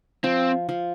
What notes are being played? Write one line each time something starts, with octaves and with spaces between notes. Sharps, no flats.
F3 C4
F3